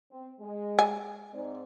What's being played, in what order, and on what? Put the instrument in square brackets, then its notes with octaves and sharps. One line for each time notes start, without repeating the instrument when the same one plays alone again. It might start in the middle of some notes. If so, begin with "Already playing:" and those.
[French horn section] C4
G#3
[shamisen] G#5
[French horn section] G#2 C4 D5